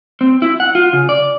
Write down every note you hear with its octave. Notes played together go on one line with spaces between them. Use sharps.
C4
E4
F#5
F4
C#3
D5